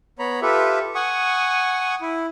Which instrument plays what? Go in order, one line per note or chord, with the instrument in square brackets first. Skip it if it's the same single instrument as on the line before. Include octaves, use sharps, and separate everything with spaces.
[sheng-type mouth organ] B3 C#5 A#5 B5
F4 G4 A4 B4 E5
F#5 G#5 C#6 D#6
E4